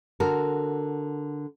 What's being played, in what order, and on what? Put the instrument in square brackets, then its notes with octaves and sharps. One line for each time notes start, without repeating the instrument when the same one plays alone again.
[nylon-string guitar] D3 F#4 A4 A#4